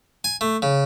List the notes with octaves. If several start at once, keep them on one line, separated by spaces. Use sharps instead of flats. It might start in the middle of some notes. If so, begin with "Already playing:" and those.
G#5
A3
C#3